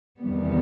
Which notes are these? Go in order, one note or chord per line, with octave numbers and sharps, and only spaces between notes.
E2 C3 D#3 G3 B3